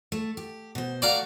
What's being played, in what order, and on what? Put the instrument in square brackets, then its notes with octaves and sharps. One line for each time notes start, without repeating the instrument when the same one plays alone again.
[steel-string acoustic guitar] A3
G4
B2 C5
[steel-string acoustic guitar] A3 F#4 [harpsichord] D5 F5 A#5